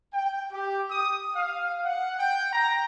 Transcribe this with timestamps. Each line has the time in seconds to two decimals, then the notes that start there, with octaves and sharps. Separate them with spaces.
0.14 G5
0.53 G4
0.91 D#6
1.36 F5
1.84 F#5
2.19 G5
2.53 A#5